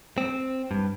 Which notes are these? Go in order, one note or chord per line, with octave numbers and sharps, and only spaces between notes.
C4
G2